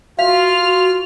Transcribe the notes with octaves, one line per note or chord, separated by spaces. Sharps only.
F4 F#4 F5 F6
F#4